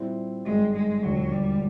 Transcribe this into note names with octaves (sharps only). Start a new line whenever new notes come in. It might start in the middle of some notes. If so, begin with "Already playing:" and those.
Already playing: A#2 G3 C4 E4
G#1 G2 D#3 G3 G#3
G#3
E1 D#2 D3 F3 F#3 G#3
G3